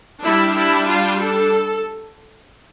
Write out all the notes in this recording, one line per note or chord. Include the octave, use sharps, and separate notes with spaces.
G3 D4 E4
E4
F4
A4